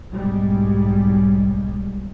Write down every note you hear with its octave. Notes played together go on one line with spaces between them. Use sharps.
B1 G#2 G3 G#3